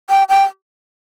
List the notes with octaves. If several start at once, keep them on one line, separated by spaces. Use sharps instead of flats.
G5
G5